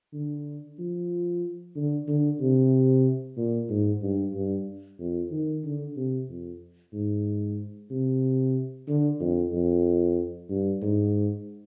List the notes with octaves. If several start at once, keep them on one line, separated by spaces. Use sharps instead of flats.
D3
F3
D3
D3
C3
A#2
G#2
G2
G2
F2
D#3
D3
C3
F2
G#2
C3
D3
F2
F2
G2
G#2